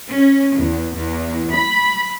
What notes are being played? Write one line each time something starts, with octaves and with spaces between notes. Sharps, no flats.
C#4
E2
E2
B5